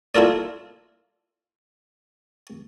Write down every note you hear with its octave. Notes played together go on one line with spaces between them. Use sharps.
E4 F4 A4 A#4 D5